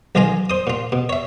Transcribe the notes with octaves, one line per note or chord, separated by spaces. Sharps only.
B1 D#3 E3 F4 G#5 A#5
C5 D#6
A#2 F4
B2
C#5 E5